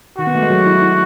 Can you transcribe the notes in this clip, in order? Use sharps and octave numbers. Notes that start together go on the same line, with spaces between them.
D#3 F#4
B3
A3
G#3
F#3
E4
E4